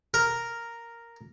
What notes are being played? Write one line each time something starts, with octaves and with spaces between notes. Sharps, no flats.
A#4